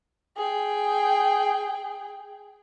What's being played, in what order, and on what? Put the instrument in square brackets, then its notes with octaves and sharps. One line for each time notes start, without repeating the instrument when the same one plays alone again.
[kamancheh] G#4 G5